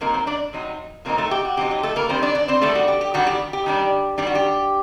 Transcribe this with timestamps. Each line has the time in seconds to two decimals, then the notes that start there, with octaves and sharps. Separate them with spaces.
0.01 C3 F#3 A#3 D#4 A#4
0.14 C4 C5
0.27 D4 D5
0.53 C3 F#3 C4 D#4
1.05 C3 F#3 A#3 C4 D#4 A#4
1.18 A3 A4
1.31 G4
1.45 F#4
1.57 C3 F#3 C4 D#4 G4
1.71 G4
1.83 A3 A4
1.96 A#3 A#4
2.09 D#3 G3 C4 D4 C5
2.22 D4 D5
2.35 D4 D5
2.48 C4 C5
2.61 D#3 G3 A3 D4 A4
2.75 F#4
2.88 G4
3.01 G4
3.14 D#3 G3 D4 F#4
3.27 G4
3.53 G4
3.66 D#3 G3 D4
4.18 D#3 G3 D4 G4
4.27 F#4
4.35 G4